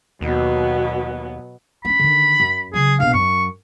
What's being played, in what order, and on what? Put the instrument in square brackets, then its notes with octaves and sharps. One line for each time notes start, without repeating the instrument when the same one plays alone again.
[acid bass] D#2 [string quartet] B2 F#3 B3
[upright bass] A#3 C#4 [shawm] B5
[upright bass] D3 D#3
F#2
[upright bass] C#3 F#3 [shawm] G#4
[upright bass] A#1 B2 [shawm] F5
[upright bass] F#2 [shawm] C#6